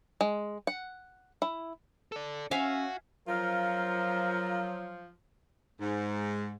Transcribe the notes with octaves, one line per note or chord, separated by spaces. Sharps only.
G#3
F#5
E4
A4 D5
C#4 F#4 E5 F5 G#5
F3 F#3 F4 A#4
G#2